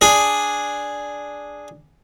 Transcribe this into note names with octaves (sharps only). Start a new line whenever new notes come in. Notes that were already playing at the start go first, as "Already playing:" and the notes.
D4 G#4